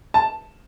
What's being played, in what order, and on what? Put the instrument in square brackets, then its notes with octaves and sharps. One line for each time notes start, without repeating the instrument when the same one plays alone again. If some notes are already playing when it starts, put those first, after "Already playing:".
[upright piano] A5